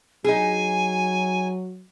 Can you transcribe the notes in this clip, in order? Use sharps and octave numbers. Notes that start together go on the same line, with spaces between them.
F#3 D#4 G#4 G#5